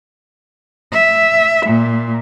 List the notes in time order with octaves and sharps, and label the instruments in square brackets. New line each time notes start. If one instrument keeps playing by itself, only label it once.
[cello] E5
A#2